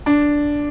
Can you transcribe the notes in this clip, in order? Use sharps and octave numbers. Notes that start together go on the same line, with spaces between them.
D4